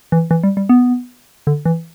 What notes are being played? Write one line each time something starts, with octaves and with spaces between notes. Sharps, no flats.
E3
E3
G3
G3
B3
D3
E3